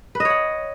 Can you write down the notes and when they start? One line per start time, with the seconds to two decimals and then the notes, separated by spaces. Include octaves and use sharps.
0.15 B4
0.20 D#5
0.25 C#5
0.30 F#5